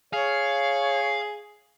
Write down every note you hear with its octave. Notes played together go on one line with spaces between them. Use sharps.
G#4 C#5 F5